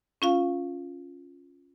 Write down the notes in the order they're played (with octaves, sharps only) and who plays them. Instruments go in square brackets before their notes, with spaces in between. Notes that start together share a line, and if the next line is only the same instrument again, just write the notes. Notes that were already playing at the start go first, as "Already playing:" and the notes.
[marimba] C#4 F4 F5